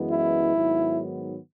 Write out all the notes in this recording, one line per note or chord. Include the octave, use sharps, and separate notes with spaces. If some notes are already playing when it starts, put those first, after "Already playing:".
Already playing: F#2 E3 G#3 B3
E4
G#2 D#3 F#3 B3